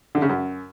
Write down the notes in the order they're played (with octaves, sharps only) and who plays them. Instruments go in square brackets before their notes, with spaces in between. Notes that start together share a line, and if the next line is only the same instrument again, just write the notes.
[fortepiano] D3
C#3
F#2